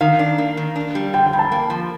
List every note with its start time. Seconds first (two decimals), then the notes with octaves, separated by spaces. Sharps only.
0.01 D#3 F5
0.19 D4
0.38 A#3
0.57 D#3
0.76 D4
0.95 G3
1.13 D3 G5
1.26 G5
1.33 G2
1.39 A5
1.52 A#3
1.70 F3